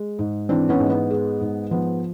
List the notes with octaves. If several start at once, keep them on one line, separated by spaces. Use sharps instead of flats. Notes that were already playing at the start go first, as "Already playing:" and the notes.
Already playing: G#3
G#2
E3 C4 D4
B3 C#4
G#2
B3
G#3
G#2
F3 B3